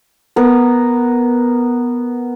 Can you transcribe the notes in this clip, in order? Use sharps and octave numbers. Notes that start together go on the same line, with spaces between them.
B3 A#4